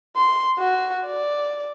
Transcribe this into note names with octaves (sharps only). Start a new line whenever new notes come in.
C6
F#4
D5